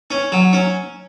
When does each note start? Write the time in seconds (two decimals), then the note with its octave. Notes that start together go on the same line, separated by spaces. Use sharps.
0.11 C#4
0.32 F#3
0.53 C#4